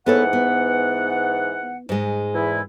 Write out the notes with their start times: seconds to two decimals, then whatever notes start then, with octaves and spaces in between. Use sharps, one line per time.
0.06 G#2 E3 B3 A4 C#5 F#5
0.33 B3
1.89 G#2 G#3
2.33 E2 E4